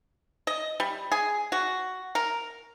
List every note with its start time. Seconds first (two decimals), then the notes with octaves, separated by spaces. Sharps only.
0.47 D#5
0.80 G3
1.12 G#4
1.52 F#4
2.15 A#4